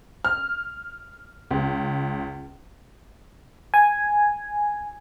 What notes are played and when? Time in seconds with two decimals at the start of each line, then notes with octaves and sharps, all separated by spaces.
0.25 F6
1.51 C#2
3.74 G#5